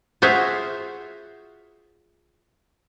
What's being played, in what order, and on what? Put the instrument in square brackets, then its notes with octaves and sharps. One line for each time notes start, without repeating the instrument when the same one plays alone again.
[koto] F4 F#4 G#4 C5 E5 F5